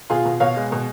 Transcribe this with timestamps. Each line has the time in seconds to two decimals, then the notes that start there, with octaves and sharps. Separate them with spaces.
0.10 B2 F4 G#4
0.25 B2
0.40 B2 C#5 F5
0.56 G#3
0.72 B2